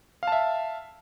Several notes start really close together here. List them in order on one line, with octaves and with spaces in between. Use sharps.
F5 A5 E5